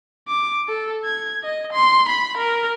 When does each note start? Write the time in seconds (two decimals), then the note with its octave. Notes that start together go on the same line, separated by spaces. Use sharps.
0.28 D6
0.68 A4
1.04 G#6
1.43 D#5
1.73 C6
2.08 B5
2.37 A#4